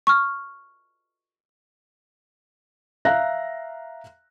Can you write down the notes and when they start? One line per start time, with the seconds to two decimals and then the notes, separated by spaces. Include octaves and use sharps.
0.07 C#6 F6
3.05 E5 F5 A#5 F#6 A#6